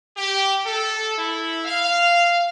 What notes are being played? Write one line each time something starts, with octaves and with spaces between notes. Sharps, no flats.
G4
A4
E4
F5